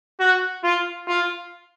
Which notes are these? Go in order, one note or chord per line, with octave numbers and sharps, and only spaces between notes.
F#4
F4
F4